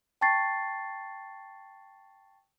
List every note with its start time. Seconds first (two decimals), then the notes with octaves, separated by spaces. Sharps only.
0.21 G5 A5 C#6 A6 C7